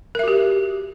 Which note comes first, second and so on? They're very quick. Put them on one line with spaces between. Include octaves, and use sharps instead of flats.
A#4 E5 F#4 G4